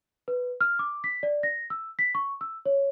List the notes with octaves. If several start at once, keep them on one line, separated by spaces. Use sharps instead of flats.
B4
F6
D6
B6
D5
A#6
E6
B6
C#6
E6
C#5